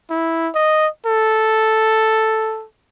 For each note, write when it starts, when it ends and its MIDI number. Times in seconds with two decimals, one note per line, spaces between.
0.10 0.49 64
0.55 0.87 75
1.06 2.65 69